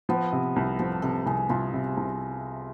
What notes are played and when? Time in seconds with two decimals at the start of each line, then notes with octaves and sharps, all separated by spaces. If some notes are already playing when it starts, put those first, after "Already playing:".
0.09 F3 B3
0.33 C3
0.56 C2
0.79 F3 A4
1.02 C3 A4
1.26 C2 G#4
1.49 C2 F4
1.73 C3
1.97 C2